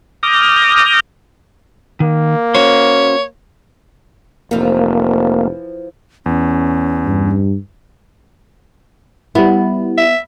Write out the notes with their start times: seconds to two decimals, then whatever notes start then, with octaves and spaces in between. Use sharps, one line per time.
0.23 D6 D#6 F6 G6 A#6
2.00 D#3 A#3
2.55 C#4 F#4 C5 C#5
4.51 F1 E3 F3 A#3
6.26 E2 C#4
7.06 G2
9.35 G3 B3 E4
9.98 E5